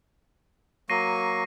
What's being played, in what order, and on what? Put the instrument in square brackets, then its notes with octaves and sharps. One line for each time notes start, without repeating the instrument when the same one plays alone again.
[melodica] F#3 A#3 C#6 [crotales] A#6 C7 D#7